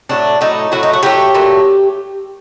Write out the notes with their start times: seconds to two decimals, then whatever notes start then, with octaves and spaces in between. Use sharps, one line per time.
0.09 A2 F#3 A3 D4
0.41 A2 F#3 A3 D#4
0.72 A2 F#3 A3 F#4
0.83 D#4
0.93 F#4
1.03 A2 F#3 A3 G4
1.34 A#2 F#3 A3